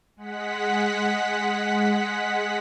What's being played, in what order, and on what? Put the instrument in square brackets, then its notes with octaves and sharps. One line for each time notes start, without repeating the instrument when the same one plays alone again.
[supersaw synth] G#3 F#5 B6